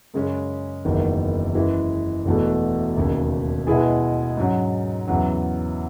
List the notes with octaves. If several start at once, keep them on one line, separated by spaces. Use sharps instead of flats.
F#2 C#3 G#3 C#4
F#1 E2 D#3
F#2 E3 G#3
E1 E2 B2 A3
E1 D#2 C#3
B2 G#3 B3 E4 G#4
G#2 F#3 C#4
E2 C#3 F#3